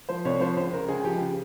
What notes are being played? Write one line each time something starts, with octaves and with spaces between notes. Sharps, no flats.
F3 C5
C2 C#5
F3 C5
C#2 C5
C#2 A#4
C#2 G#4
F3 G4
C#3